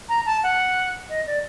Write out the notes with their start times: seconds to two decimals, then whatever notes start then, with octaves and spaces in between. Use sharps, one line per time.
0.09 A#5
0.26 A5
0.43 F#5
1.10 D#5
1.27 D5